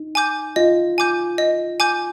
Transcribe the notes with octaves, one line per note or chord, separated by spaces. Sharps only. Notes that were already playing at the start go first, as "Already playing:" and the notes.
Already playing: D#4
G#5 D6 G6
F4 D#5
G#5 D6 G6
D#5
G#5 D6 G6